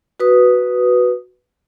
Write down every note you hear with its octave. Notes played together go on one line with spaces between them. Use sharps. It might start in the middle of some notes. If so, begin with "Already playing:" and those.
F#4 B4 D#6